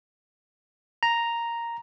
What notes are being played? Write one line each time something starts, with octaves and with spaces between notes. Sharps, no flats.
A#5